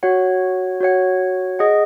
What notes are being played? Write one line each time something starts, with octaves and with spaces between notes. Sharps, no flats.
F#4 C#5 F#5
F#4 C#5 F#5
G#4 D#5 F#5